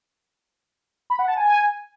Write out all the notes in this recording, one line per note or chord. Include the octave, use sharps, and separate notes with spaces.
B5
F#5
A5
G#5